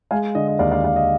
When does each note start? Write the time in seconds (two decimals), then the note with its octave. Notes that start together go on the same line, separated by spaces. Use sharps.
0.11 G#3 F5 G#5
0.35 D3 D#5
0.48 D#5
0.59 D#2 D5 F5
0.71 D5 F5
0.83 D#2 D5 F5
0.96 D#5